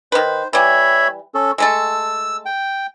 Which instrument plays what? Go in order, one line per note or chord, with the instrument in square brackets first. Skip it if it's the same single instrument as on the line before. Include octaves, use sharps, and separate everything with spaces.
[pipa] D#3 B4 [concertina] C5
[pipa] E3 G3 [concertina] C#5 E5 B5
[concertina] C#4 A4
[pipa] G#3 A3 A4 [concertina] E6
[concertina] G5